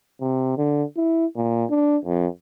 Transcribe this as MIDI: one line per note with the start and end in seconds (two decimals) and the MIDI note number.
0.21 0.57 48
0.58 0.83 50
0.97 1.26 64
1.36 1.65 46
1.70 1.97 62
2.05 2.27 41